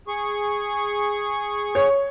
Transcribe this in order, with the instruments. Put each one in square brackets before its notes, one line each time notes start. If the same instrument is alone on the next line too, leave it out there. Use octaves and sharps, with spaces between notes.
[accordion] G#4 C#6
[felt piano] C#5